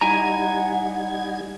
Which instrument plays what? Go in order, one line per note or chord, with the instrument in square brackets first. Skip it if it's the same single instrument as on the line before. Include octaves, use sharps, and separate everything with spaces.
[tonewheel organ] G3 D#4 G#6 [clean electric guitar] E4 G#5 A#5 [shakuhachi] F#5